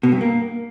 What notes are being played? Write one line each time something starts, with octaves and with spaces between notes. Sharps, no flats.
B2
G2
A#3